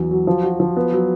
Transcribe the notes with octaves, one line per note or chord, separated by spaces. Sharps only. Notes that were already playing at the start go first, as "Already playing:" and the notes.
Already playing: E2 F#3
F#3
F3
F#4
F3
B3
F#3